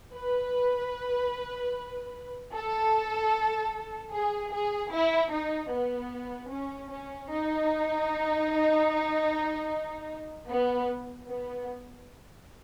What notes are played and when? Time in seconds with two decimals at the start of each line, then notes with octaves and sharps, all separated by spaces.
0.14 B4
2.54 A4
4.13 G#4
4.52 G#4
4.92 E4
5.32 D#4
5.72 B3
6.51 C#4
6.91 C#4
7.30 D#4
10.49 B3
11.28 B3